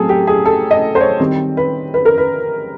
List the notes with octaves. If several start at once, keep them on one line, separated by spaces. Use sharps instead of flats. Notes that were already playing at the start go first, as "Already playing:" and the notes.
Already playing: A2 F#3 A3 C4 G#4 A4
G4
G#4
A4
D#5
C5
C#5
D#3 G3 C4
B4
B4
A#4
B4